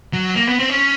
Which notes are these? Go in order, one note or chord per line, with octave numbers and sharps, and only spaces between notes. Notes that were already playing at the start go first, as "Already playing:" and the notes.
F#3
A#3
B3
C4
C#4